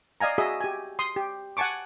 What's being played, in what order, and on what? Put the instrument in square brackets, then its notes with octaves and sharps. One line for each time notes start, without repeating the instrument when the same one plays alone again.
[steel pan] D5 D#5 F5 G#5 A#5
F#4 G#4 D#5 E5 D#6
G4 G#5
C6 D#6
G4
F#5 G#5 A5 C#6 D6